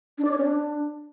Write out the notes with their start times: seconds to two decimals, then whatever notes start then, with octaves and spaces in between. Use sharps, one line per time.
0.18 D4
0.25 D5
0.31 C#5
0.38 C#4
0.44 D4